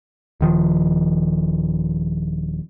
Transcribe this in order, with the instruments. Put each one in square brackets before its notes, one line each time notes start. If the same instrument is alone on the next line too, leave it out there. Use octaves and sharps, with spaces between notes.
[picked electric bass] D#1 D#3 F3